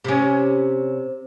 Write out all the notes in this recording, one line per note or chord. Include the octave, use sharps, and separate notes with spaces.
C3 C#4